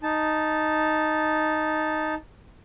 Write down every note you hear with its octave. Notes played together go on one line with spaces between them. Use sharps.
D#4 A5